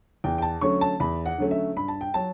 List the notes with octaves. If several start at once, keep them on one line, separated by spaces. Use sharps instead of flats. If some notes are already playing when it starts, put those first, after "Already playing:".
E2 G5
G5
A5
D3 F#3 A3 C#4 C#6
A5
E2 B5
F#5
D3 F#3 A3 C#4
E5
G2 B5
A5
G5
F#3 A5